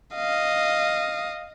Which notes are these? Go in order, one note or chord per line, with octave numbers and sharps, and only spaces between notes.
D#5 F5